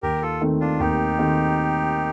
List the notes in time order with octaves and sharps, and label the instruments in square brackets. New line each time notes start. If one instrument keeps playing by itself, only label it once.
[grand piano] D#2 [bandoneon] G4 A#4
[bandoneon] F4 A4
[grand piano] D#3 A3 C4
[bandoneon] D4 F4
[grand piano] D#2 [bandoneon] D#4 G4
[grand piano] D#3 A3 C4